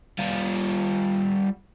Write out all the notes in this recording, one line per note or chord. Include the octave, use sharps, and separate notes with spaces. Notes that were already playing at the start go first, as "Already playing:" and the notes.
G3 F4